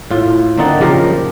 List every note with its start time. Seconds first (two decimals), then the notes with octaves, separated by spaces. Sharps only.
0.11 A2 F4
0.58 D3 A#3 C4 D#4 F#5 A5
0.81 C#3 F3 G4 A#4